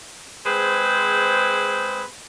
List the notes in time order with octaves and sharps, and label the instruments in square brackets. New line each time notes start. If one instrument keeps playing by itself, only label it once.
[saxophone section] G#3 C4 G#4 B4 C5